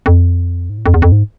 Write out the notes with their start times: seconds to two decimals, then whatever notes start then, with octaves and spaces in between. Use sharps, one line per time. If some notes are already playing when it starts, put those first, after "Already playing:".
0.06 F2
0.70 G#2
0.78 A2
0.86 F2
0.94 E2
1.02 F2
1.12 G#2